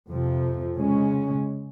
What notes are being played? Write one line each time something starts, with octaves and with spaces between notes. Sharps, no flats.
F2 C3 F3
C#3 G#3 C#4